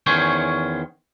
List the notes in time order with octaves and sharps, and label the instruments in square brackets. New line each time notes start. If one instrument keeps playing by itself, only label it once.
[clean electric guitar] E2 D#3 C#4 C5 C#5